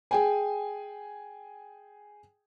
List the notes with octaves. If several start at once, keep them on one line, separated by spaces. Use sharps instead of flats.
G#4 G5 G#5